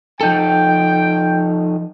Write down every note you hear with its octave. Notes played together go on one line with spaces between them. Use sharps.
F3 D#4 A4 G5